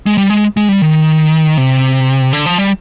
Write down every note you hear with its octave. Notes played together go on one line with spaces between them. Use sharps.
G#3
G3
G#3
G#3
G3
D#3
C3
D3
F3
G3